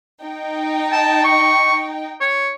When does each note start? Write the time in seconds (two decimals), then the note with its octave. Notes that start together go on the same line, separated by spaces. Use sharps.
0.23 D#4 G5
0.92 A5
1.25 C#6
2.21 C#5